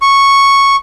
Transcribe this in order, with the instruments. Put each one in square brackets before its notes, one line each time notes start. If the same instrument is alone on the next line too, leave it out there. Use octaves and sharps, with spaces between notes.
[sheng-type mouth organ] C#6